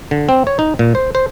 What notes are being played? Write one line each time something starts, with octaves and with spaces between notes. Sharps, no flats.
D3
C4
C#5
D#4
A#2
C5
C5